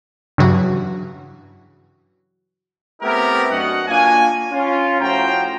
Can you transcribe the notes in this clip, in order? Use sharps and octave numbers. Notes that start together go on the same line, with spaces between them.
G2 C#3 E3 F#3 F#4
A3 B3 C4 E4 G4 A#4
F#2 D4 F#4 D#5 F#5
A#3 D4 F4 C#5 G#5
C#4 F4
A2 F3 F#4 C5 G5 A#5